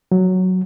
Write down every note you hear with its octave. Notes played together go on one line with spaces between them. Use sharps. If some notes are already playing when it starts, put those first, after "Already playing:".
F#3